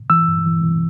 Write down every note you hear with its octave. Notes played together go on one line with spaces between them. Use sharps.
E3 E6
G2
E3
E3